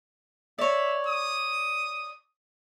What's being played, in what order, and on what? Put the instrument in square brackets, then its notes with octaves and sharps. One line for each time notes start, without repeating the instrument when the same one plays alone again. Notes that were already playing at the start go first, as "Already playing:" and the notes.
[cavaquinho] C#5 D5 [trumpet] E5
[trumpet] D#6